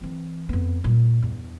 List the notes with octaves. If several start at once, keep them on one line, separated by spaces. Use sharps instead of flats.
E3 C4
F2 B3
A#2 G3
E2 G2